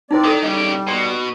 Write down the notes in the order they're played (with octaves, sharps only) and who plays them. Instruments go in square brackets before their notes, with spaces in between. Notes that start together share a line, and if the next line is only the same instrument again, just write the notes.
[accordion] C4 D5 [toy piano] D#4 E4 C5
[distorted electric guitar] D#3 [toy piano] A4 D6
[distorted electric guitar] C#3 G4 [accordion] G3 [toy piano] D#5
[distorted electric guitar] B2 [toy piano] D5 C6